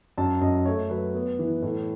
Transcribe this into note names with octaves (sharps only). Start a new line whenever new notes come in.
F#2 A5
F#2 D#5
A3 C#5
F#3 B4
B3
E3
A2